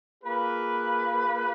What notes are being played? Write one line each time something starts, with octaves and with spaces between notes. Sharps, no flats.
A#3 F4 G#4 B4